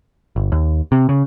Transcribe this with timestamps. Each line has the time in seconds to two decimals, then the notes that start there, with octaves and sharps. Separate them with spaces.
0.36 G1
0.52 D#2
0.92 C3
1.09 C#3